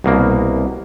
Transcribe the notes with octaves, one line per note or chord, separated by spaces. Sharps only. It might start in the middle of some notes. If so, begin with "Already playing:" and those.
C2 B2 A#3